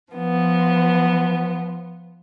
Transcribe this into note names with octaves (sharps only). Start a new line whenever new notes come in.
F3 B3